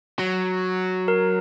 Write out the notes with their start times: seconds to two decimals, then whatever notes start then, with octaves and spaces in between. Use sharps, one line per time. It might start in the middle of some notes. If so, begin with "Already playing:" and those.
0.19 F#3
1.08 A#4